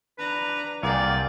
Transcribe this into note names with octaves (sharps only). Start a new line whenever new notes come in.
D4 B4 A#5
C2 A#3 G#4 D5 G5